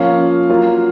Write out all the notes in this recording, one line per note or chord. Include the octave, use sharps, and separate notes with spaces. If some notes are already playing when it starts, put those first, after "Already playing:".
Already playing: F3 A#3 C#4 F4 F5
F#3 A#3 F4